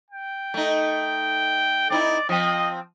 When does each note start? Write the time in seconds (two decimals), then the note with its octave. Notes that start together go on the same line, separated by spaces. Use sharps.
0.10 G5
0.54 A3 D#4
1.90 C4 D#4 E4 D5
2.29 F3 C4 D#5